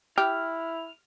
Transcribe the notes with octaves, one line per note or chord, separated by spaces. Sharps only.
E4 G4 F6